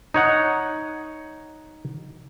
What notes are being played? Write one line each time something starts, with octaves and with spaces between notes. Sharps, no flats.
D#4 C#5 F#5